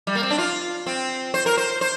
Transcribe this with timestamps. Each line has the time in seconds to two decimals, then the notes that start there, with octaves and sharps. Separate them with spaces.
0.07 G3
0.15 A#3
0.23 C4
0.30 D4
0.38 F4
0.86 C4
1.34 C5
1.46 A#4
1.57 C5
1.81 C5